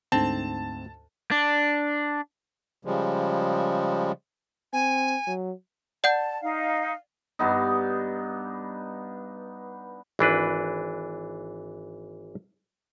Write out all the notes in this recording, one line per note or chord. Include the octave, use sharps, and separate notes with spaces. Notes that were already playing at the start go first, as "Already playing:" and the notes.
D2 G#2 C4 A5
D4
C#3 F3 G3 G#3
C4 G#5
F#3
D5 F#5 A5 G6
D#4 F5
G2 B3 D#4
G#1 E3 D4 B4